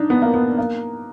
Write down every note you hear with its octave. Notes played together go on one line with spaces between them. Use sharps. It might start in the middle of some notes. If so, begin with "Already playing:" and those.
Already playing: D4 D#4
B3
A#3
B3
A#3